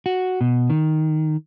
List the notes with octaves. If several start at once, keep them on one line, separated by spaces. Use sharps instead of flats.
F#4
B2
D#3